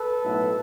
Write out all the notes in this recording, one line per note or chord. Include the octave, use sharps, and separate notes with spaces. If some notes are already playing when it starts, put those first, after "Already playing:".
Already playing: A4 B4
B1 A2 F#3 A3